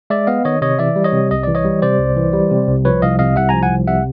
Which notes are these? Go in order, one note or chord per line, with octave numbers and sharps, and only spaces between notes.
G#3 D5 E5
B3 D#5 F5
D#3 C#5 D#5
C3 C#5 D#5
E3 D5 E5
G3
C#5 D#5
C3
C2 D#5
E3 D5
C#5 D#5
G3
C3 C5 D5
C2
E3
G3
C3
C2
F3 B4 C#5
C2 D#5 F5
C3 D#5 F5
C2 E5 F#5
F3 G#5 A#5
F#5 G#5
C2
C3 E5 F#5